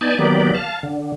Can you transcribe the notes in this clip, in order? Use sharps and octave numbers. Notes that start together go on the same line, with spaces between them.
B3 D#4 D5 G#5 A5
D#3 F#3 A#3 B3 G4 D5
F5 A5
D3